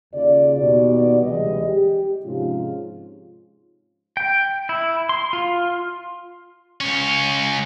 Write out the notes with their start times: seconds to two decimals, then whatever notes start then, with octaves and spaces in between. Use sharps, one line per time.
0.13 D#2 C#3 F4 D5
0.56 D#2 B2 D#4 G4 D5
1.21 D2 C3 E3 G3 G#3 D#5
1.65 G4
2.24 G#2 C3 F3 C#4 F4
4.17 G5
4.69 E4
5.09 C6
5.33 F4
6.81 C#2 C#4